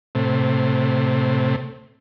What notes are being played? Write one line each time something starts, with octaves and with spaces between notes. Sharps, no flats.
A2 C3